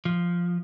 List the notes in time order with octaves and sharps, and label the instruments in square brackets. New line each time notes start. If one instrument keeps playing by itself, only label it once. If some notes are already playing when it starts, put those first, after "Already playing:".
[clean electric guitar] F3